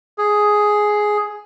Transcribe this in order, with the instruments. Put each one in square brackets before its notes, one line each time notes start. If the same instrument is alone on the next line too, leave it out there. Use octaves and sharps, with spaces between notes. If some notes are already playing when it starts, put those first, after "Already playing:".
[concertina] G#4